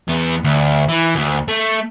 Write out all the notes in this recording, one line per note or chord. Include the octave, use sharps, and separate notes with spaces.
E2 B3
D2
E3
D2
A3